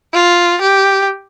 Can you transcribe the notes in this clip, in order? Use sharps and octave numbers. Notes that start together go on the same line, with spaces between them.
F4
G4